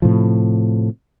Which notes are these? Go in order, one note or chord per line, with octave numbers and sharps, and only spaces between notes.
A2 C3 F3